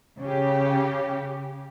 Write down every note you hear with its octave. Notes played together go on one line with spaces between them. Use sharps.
C#3 G4